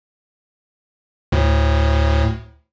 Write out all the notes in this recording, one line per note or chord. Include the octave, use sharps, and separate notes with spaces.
D2 A2